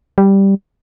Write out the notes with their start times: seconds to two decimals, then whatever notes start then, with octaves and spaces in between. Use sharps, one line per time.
0.18 G3